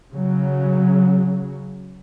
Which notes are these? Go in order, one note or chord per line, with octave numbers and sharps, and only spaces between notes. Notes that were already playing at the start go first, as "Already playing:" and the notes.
C#3 F#3